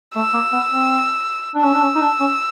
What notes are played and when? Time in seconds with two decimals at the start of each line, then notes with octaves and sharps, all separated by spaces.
0.16 A3 E6
0.34 A#3
0.52 B3
0.71 C4
1.55 D4
1.64 C#4 E6
1.74 D4
1.82 C#4
1.96 D#4
2.01 D4
2.20 C#4